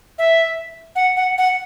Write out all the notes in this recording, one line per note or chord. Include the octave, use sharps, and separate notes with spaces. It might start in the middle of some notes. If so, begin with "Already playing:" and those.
E5
F#5
F#5
F#5